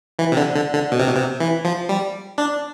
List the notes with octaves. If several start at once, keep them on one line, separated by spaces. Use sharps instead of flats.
E3
C3
D3
D3
D3
B2
C3
B2
C3
E3
F3
G3
D4